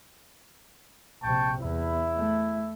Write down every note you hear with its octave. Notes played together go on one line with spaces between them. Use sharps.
A#1 C3 G5 A5 C#6
E2 E4
A3